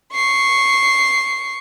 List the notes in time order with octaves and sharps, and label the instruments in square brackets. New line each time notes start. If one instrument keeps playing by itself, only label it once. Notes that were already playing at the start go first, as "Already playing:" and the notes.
[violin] C#6 C7